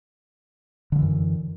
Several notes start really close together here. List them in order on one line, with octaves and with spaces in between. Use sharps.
D3 F3 E3 F#2